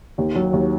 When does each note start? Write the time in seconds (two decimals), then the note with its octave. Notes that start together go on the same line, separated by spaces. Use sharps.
0.18 D#2
0.35 F#3
0.53 D#2